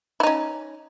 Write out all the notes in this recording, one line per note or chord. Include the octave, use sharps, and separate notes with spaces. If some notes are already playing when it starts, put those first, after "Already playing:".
C#4 D#4 E4